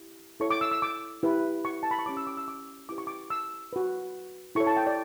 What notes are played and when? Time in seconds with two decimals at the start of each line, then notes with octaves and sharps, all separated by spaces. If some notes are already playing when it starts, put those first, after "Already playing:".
Already playing: E4 G4
0.40 E4 A4 C#5 C#6
0.51 D6
0.61 E6
0.71 E6
0.82 D6
1.23 E4 G4 B4
1.65 C#6
1.83 A5
1.91 B5
1.99 C#6
2.06 C#4 G4 C#5 D6
2.17 E6
2.27 D6
2.37 E6
2.48 D6
2.89 E4 G4 B4 D6
2.98 C#6
3.07 D6
3.30 E6
3.73 F#4 B4
4.55 E4 A4 C#5 C#6
4.67 A5
4.77 G5
4.87 D5